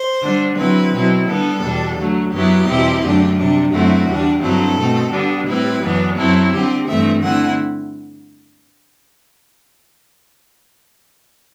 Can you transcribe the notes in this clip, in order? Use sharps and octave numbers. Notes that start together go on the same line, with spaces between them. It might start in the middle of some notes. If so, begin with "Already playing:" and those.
Already playing: C5
D3 G3 D4
D3 F#3 C4 E4 B4
B2 F#3 C4 E4
D3 G3 B3 A4
E2 B2 G3 D4
D3 F#3 A3
F#2 F#3 B3 E4 G4
E2 B2 G3 C4 E4
F#2 D3 A3 D4
C3 G3 D4
F#2 D3 A3 C4 E4 F#4
E2 D3 G3 D4
G2 D3 F#3 C4 E4 A4
B2 A3 C4
D3 G3 B3 D4
A2 G3 C4 E4 B4
F#2 E3 B3 D4
F#2 F#3 C4 E4 A4
D3 G3 C4 G4
G2 E3 A3 C4 E5
D3 A3 C4 E4 F#5